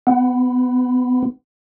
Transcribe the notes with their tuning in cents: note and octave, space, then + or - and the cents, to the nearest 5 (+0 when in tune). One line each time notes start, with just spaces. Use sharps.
B3 +25